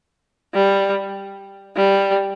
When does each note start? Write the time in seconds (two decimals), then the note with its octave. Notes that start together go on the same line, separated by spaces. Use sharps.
0.54 G3
1.76 G3